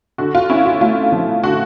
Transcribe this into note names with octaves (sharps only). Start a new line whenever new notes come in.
D3 F#4
F4
C#4 E4
F4
A3 F4
F3
D3 F#4